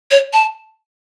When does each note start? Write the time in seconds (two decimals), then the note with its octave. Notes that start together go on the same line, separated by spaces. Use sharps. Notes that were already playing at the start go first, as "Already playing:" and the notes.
0.11 C#5
0.33 A5